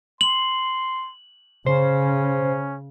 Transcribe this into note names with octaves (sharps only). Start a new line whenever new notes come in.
C6 F#7
C#3 C#4 C5